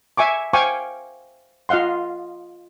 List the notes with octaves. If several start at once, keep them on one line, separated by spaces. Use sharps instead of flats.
E5 G#5 C#6 D6
C5 F5 G5 G#5 C#6 D6
F4 D#5 F5 F#5 C6